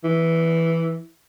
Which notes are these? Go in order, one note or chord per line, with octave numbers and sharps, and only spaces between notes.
E3